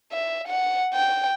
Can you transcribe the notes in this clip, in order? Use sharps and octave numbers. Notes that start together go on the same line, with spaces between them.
E5
F#5
G5